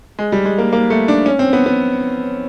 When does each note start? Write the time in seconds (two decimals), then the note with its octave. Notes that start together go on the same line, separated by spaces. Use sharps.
0.19 G#3
0.32 G3
0.45 G#3
0.58 A#3
0.73 A#3
0.90 A3
1.08 D4
1.26 C#4
1.39 C4
1.53 B3
1.66 B3